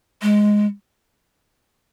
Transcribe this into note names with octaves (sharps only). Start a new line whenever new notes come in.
G#3